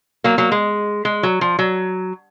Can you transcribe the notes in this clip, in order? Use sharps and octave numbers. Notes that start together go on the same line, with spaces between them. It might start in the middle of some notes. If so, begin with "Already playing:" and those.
F#3 A#3
F#3 A#3
G#3
G#3
F#3
F3
F#3